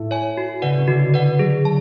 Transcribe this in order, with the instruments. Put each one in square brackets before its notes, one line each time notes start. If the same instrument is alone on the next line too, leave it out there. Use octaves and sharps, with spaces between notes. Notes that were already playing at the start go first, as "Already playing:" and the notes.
Already playing: [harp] A2 A3
[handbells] C#5 G#5
F#4
[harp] C#3 C#4 [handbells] B4 D5 F#5
[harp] C#4
[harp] D3 D4 [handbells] F#4
[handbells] B4 D5 F#5
[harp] F#3 F#4 [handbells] G#4
[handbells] A5